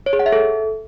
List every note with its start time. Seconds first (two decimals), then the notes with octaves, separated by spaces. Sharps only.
0.06 C#5
0.13 G#4
0.19 F#5
0.26 E5
0.32 A4